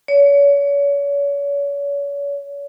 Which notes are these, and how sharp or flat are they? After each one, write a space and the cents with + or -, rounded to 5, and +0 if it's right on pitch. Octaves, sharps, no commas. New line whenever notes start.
C#5 +35